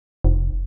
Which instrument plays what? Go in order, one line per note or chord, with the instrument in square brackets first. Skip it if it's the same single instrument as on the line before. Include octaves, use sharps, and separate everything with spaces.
[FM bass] F1